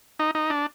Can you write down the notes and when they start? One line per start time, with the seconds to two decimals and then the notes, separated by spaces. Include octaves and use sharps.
0.19 D#4
0.35 D#4
0.50 D4